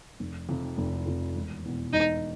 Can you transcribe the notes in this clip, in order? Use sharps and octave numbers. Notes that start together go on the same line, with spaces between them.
F1
F2 C3 F3
F1
F2 C3 F3
E1
E2 B2
E1 D#4